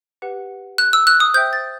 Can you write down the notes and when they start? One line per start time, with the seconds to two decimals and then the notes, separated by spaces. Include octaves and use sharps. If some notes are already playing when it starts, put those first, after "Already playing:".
0.22 G4 B4 F#5
0.78 F#6
0.93 E6
1.07 F#6
1.20 D#6
1.34 C5 E5 G5 G6
1.53 A6